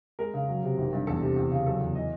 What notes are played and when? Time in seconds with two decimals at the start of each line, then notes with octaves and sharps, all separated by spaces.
0.19 G#3 A#4
0.34 C#3
0.48 F#3
0.63 C3
0.78 G#1
0.93 G2
1.07 E2 A4
1.22 C3
1.36 E2
1.52 C#3
1.66 F#3 A4
1.81 E2
1.95 E3 D#5